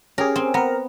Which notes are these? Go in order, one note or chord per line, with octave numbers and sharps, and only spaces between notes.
C#4 G4 G#4 A#4
C4
B3 A#4 A#5